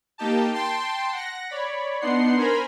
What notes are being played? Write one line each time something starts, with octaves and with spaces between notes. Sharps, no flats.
A#3 D#4 G4 A5
G5 A5 C6
F#5 A#6
C#5 D5 B5
B3 D4 D#4 F#5 C6 C7
A#4 C5 G#5 A#5 B5